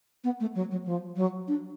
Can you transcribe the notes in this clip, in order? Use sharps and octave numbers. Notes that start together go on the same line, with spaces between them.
B3
A3
F#3
F#3
F3
F#3
D4